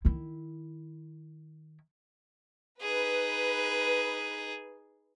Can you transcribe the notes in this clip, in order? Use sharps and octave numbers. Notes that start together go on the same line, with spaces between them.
D#3 E4
D#4 G#4 B4